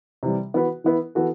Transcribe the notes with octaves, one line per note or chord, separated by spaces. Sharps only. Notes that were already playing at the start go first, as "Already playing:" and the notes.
C3 E3 G3
E3 B3 F#4 B4
E3 B3 E4 B4
E3 B3 F#4 A4